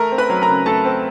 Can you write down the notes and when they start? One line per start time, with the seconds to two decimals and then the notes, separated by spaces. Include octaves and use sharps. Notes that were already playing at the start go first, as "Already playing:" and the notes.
Already playing: A3 A#4 A#5
0.12 C4
0.18 B4 B5
0.30 F#3
0.42 A#4 A#5
0.49 C#3
0.66 A3 A4 A5
0.85 C4